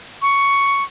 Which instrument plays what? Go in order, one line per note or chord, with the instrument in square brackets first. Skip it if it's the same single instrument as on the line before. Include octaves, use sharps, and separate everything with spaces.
[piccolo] C#6